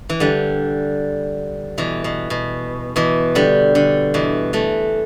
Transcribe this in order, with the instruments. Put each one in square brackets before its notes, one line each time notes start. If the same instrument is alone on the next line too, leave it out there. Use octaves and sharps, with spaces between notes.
[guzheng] E3
D3 G3
B2 E3
B2
B2
B2 E3
D3 G3
D3
B2 E3
E3 A3